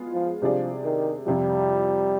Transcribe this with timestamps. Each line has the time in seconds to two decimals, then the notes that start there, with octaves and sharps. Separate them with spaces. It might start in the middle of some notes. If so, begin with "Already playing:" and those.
Already playing: G#3 B3 F4 G#4
0.14 F3
0.42 C3 F3 G3 D4 G#4 D5
0.84 D#3
1.26 F2 C3 F3 G3